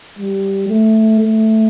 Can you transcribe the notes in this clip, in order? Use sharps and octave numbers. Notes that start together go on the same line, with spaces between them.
G3
A3
A3